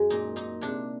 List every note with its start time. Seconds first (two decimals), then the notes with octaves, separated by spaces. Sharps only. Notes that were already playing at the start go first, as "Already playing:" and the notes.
Already playing: F#2 F#3 G#3
0.10 A#2 D#4
0.36 A#2 D#4
0.61 C3 D4